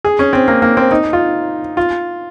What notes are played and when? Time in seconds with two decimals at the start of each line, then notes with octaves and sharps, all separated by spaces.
0.05 G#4
0.19 C#4
0.33 C4
0.48 A#3
0.62 A#3
0.77 C4
0.91 D#4
1.13 F4
1.77 F4